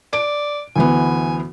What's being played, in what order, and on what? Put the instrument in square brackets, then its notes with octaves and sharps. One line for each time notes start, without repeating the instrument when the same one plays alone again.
[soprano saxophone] D5 [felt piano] D7
[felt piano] D2 E3 B3 [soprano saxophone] G#5